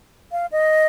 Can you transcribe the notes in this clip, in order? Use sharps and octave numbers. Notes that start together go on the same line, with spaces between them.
F5
D#5